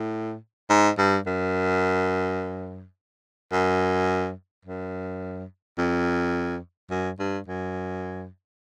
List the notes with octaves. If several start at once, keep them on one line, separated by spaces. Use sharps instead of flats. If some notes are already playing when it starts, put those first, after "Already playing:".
Already playing: A2
G#2
G2
F#2
F#2
F#2
F2
F#2
G2
F#2